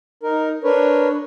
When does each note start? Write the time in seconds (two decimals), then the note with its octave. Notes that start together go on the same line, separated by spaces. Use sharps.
0.23 D#4 A#4
0.64 D4 A#4 B4 C#5